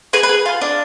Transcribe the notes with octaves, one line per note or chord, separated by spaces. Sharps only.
G#4 B4
B4
G#4
F4
D4